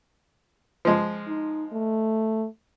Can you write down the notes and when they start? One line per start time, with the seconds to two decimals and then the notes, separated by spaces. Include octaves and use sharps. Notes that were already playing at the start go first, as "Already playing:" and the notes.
0.85 F3 G#3
1.27 D#4
1.73 A3